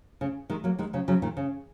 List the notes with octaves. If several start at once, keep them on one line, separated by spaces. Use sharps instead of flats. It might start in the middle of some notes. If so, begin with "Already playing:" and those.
C#3
D#3 G#3
F#3 A#3
D#3 G#3
C#3 F#3
C#3 F#3
A#2 D#3
C#3